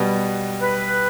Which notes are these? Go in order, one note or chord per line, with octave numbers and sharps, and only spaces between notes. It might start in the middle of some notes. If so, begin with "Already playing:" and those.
Already playing: B2 G3 B3
B4